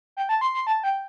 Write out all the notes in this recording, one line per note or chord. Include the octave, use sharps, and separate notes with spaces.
G5
A5
C6
C6
A5
G5